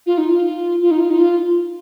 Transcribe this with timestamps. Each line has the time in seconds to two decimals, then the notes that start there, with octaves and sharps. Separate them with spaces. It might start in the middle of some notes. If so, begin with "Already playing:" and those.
0.06 F4
0.18 D#4
0.29 F4
0.82 F4
0.91 D#4
1.00 F4
1.10 D#4
1.18 F4